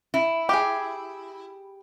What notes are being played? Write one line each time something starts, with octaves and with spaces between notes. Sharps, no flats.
E4
G4 G#4